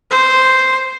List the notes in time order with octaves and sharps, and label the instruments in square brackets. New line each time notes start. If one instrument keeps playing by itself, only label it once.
[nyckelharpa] C5